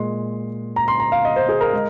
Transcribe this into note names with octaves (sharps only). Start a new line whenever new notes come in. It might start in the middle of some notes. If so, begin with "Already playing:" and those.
Already playing: A#2 G#3 C6
A#5
C6
A#5
F5
D#5
C5
G#4
A#4
G#3